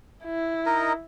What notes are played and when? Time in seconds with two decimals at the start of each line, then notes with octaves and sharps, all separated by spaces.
0.25 E4
0.66 D#4 A#4 D#5